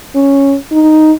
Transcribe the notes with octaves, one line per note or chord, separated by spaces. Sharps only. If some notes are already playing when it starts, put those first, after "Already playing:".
C#4
D#4